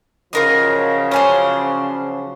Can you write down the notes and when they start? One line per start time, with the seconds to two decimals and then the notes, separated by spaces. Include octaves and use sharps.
0.33 C#3 F3 F#3 F4 A#4 D#5
1.11 C#4 D4 C5 C#5 G#5